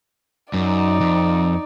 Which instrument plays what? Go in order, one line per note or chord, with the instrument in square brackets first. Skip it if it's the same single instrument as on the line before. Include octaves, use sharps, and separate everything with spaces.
[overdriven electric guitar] F#2 [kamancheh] D#4 D5
[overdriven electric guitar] F2